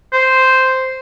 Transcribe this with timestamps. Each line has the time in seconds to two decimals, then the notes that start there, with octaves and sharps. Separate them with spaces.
0.13 C5